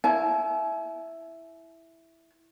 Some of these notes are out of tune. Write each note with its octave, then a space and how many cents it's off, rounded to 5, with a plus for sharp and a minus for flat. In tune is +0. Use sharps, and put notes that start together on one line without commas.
E4 +0 G#5 +45